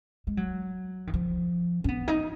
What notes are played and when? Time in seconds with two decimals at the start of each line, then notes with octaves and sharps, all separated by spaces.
0.27 G#3
0.37 F#3
1.07 D#3
1.14 F3
1.84 C#4
1.88 B3
2.08 D#4